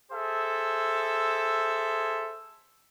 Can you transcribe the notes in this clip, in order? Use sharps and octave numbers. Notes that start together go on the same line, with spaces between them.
G#4 A4 C5 E5